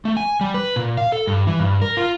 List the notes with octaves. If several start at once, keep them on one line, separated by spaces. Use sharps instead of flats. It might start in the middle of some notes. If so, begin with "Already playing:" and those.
A3
G#5
G3
B4
A#2
F5
A4
G2
E3
G2
A#4
F4